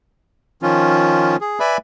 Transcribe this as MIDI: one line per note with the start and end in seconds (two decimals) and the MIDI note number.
0.63 1.36 51
0.63 1.36 53
0.63 1.36 61
0.63 1.36 65
1.41 1.59 68
1.60 1.77 71
1.60 1.77 74
1.60 1.77 76
1.60 1.77 80
1.60 1.77 83